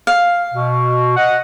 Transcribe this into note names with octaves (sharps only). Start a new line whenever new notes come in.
F5
B2
D#5 F#5